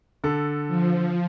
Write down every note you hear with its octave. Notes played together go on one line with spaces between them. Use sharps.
D3 A4
F3